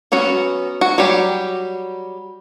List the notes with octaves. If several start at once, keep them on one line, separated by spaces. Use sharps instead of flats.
F#3 B3 C#4 F#4
F#4
F#3 G3 G4